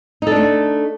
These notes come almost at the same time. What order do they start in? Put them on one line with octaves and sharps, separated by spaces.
D#4 A4 D4 A3